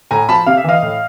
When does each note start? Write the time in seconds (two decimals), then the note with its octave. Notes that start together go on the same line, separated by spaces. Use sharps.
0.11 A2 G#5 A#5
0.29 F3 A5 B5
0.46 C3 F5
0.57 E5
0.64 E3 D#5 F5
0.82 A2